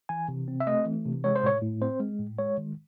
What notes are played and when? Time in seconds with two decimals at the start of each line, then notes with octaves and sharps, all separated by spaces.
0.09 E3 G#5
0.28 C3
0.48 C4
0.60 E5
0.67 A3 D#5
0.85 E3
1.05 C3
1.24 G#3 C#5
1.36 C5
1.43 A2 C#5
1.62 A2
1.82 C4 C5
2.00 G#3
2.19 A2
2.39 G#3 C#5
2.58 D#3